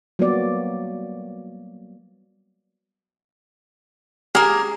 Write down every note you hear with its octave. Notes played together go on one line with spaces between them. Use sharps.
F#3 G3 A#3 B3 F#4 D5
A#3 G#4 A#4